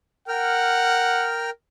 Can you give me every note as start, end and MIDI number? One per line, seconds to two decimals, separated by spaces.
0.28 1.50 70
0.28 1.30 78
0.28 1.50 79
0.28 1.50 89